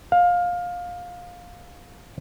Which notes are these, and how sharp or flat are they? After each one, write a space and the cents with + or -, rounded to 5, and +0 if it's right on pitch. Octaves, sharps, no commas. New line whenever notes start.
F5 +20